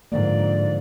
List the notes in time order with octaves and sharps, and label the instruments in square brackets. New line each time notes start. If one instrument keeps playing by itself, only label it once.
[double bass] G#2 [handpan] D3 F3 A#3 [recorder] D5